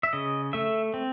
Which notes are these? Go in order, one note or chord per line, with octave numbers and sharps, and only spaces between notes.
E5
C#3 D#5
A3 E5
C4